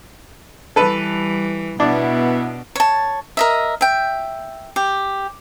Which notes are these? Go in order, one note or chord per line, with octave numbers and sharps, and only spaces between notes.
E3 G3 A4 B4
B2 B3 D4 E4
C#5 A5
A#4 D#5 E5
E5 G5
G4